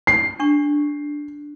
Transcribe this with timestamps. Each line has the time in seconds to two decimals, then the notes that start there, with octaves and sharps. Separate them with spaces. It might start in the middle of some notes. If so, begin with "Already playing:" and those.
0.07 C7
0.40 D4 C#6